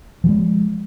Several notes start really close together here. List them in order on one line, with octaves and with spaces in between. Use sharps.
F3 F#3 G#3